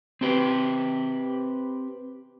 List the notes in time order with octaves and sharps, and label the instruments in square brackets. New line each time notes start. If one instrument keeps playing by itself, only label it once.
[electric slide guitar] C4 G4 B4